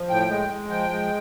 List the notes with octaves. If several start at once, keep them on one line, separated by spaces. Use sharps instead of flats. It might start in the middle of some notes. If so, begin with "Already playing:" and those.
Already playing: F3
A2 G5
G#3
G#3
F3 G5
G#3